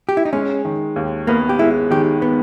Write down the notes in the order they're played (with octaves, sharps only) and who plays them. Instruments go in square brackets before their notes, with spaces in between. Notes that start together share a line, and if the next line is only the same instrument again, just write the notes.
[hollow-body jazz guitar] G4
E4
D#4
[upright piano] G#3 [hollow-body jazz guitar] C#4
[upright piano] D#3
D#2
[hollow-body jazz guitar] A#3 [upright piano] B3
[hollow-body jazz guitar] G4
[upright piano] G#3 [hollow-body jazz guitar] E4
[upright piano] D#3 [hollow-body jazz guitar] G4
[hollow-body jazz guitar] B3